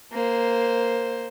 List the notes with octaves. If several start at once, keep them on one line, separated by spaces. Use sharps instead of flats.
A#3 C5